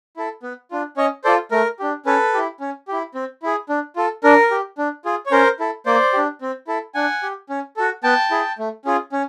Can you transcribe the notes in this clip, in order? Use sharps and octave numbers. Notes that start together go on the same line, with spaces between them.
E4 A4
B3
D4 F4
C#4 C#5 D#5
F4 A4 C5 D5
A3 A#4
D4 G4
C#4 A4 B4
E4 G4
C#4
E4 G4
C4
E4 G#4
D4
F4 A4
D4 A#4
G4
D4
F4 G#4
C#5
C#4 A#4 C5
E4 A4
A#3 C5 D5
D4 G4
C4
E4 A4
D4 F#5 G#5
G4
C#4
F#4 A4
B3 G5 A5
E4 G#4
A3
C#4 F4 G#4
C#4